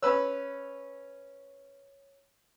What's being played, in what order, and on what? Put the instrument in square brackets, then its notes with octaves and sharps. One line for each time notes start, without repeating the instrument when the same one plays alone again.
[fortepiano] C#4 B4 E6 [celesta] C#5